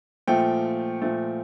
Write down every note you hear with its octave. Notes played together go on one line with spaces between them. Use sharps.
A#2 F3 A3 G5
A#2 F3 A3